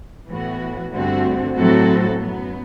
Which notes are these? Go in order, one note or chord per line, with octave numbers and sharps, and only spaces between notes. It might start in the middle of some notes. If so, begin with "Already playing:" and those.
A2 E3 B3 F#4
G2 D3 A3 C4 F#4
A2 F#3 C4 F#4 A4
F#2 F#3 B3